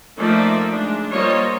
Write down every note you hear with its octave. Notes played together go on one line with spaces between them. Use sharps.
F3 A3 A#3 D#4 D5 E5
G#3 D4
G3 A#3 F4 C5 C#5 D#5